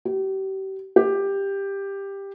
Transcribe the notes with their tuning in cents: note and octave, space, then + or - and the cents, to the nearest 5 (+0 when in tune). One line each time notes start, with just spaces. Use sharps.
G4 -35
G4 +10